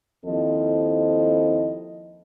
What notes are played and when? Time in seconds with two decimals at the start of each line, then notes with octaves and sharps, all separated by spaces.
0.24 D#2 F3 C4 E4 A4 D#5